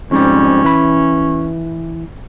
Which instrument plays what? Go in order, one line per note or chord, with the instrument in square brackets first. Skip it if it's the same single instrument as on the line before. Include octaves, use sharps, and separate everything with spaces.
[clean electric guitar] F2 G#2 G3 [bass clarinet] C#4
[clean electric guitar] E3 B5